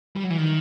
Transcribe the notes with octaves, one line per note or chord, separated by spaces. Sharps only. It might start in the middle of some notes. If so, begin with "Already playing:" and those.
G3
F#3
E3
D#3